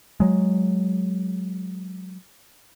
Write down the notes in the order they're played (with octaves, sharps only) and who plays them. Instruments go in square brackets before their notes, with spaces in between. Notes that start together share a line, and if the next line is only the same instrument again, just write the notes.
[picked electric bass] F#3 G#3